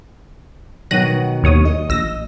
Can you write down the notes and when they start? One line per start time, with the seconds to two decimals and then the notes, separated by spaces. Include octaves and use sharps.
0.91 B2 D#3 F#3 F#6 A#6 D#7
1.43 D#2 C#5 D#6
1.65 D#5
1.89 A#1 E6 A#6